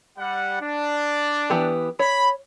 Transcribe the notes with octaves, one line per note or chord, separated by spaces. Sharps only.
G3 F#5
D4
E3 B3 G4
C#5 B5